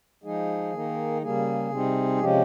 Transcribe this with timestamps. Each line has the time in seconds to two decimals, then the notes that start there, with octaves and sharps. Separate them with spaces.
0.24 F3 G#3 D#4 G#4
0.73 D#3 A#3 D#4
1.22 C#3 G3 A#3 G#4
1.70 C3 G3 C4 D#4
2.20 C3 F3 G#3 C#4 G4